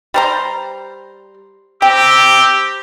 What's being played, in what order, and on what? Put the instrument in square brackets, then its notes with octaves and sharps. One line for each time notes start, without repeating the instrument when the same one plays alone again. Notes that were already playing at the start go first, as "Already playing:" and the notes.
[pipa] G3 C5 A#5
[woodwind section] C4 A#5 E6 [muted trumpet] G4 [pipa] G5